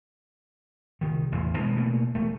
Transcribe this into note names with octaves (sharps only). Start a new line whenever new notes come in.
C2 D#3
A1 E2
B2 G#3 B3
B2 A3 A#3
E1 A3